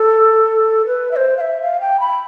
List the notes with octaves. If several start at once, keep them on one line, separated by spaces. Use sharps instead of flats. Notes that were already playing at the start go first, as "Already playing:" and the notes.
Already playing: A4
B4
E5
C5
F5
E5
F5
G5
B5